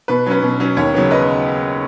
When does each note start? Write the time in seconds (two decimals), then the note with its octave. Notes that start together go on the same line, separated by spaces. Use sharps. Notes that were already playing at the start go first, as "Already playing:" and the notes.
0.08 B2 B4
0.26 F#3 C#4 B4
0.43 B2
0.60 F#3 C#4
0.77 D#2 C#5
0.94 C#3 F#3 B3
1.11 B4 D#5